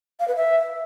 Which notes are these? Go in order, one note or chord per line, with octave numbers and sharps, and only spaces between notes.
F5
B4
E5